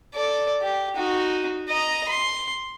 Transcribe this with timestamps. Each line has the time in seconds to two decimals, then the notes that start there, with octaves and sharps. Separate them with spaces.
0.14 A4 D5
0.62 G4
0.96 D#4 F#4
1.68 D#5 A#5
2.09 C6